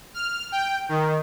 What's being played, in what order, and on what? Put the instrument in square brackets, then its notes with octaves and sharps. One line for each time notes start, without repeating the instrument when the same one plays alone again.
[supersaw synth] F6
G5
D#3